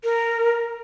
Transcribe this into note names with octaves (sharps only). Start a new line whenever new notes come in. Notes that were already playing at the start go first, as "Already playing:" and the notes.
A#4